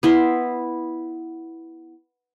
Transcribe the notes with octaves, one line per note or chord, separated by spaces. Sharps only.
B3 E4 E5 C6